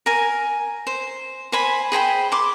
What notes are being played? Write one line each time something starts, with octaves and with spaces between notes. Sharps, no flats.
A#4 G#5
C5
C5 G#5 B5
G#4 C5 G5 B5
C6 D6